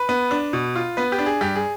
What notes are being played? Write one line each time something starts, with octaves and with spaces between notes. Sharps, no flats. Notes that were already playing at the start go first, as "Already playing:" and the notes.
Already playing: B4
B3
D4
B2
F4
B3 B4
G4
D4
G#4
G2 G4
G#4